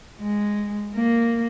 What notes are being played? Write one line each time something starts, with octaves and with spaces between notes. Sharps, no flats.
G#3
A#3